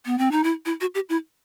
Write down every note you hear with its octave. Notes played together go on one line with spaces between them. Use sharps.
B3
C4
D#4
E4
E4
F#4
G4
E4